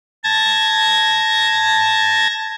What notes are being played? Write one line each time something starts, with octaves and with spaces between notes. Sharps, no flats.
A5 G#6 A#6